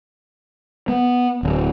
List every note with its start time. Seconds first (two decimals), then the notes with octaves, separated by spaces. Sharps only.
0.88 B3
1.43 D1